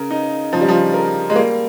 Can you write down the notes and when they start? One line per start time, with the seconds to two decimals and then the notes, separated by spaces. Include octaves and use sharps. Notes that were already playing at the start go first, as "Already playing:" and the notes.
Already playing: C#3 A#4
0.11 D#4
0.53 C#3 F3
0.61 G3
0.68 F3
0.94 A#4
1.30 G#3
1.36 G3 A#3